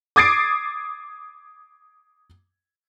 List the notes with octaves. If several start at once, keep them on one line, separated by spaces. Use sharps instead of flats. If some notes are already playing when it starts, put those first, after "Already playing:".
D6 D#6 G#6 A6 C7 D7